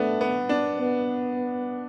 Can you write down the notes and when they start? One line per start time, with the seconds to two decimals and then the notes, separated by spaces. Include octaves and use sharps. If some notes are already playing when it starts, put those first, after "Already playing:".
Already playing: A3 B3 D4
0.21 B3
0.49 D4
0.79 B3